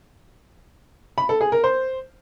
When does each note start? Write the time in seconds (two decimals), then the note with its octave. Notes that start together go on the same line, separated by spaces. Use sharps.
1.18 B5
1.29 A4
1.41 G#4
1.52 A#4
1.64 C5